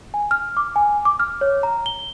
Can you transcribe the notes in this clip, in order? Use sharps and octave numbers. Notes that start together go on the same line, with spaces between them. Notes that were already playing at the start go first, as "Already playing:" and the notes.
G#5
F6
D6
G#5
D6
F6
C#5
A#5
G7